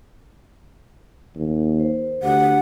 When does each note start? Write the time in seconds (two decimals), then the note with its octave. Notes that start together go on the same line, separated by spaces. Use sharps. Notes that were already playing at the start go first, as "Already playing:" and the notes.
1.36 D#2
1.79 C5
2.23 D2 D4 G4 F#5